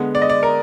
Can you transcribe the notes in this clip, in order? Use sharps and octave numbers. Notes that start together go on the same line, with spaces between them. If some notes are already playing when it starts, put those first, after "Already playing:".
Already playing: D3 G#3 B3
D5
D#5
D5
A#4